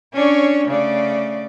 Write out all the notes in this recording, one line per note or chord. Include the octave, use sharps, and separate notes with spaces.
C#4 D4 C#5
C#3 A3 D5